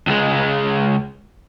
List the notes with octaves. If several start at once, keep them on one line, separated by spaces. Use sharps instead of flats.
C#2 G#3